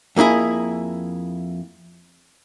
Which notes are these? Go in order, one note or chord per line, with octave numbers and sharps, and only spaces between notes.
F2 A#3 D4 E4 G#4